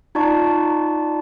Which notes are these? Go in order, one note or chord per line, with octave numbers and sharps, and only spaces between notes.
D#4 F4 D5 A5 C#6